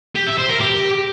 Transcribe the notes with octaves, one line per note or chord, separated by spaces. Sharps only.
G4
E5
C5
A#4
G4